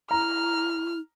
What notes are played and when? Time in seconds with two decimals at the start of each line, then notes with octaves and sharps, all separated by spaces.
0.11 E4 A#5 F6